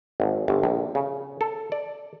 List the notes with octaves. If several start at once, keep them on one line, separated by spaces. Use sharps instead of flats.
G#1
G1
A#1
C#3
A4
D5